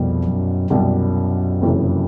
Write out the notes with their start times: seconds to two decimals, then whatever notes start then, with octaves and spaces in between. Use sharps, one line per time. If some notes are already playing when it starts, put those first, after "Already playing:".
Already playing: C2 F2 B2 G3
0.24 F#2
0.70 C2 F#2 B2 G3
1.62 F#1 F2 C3 E3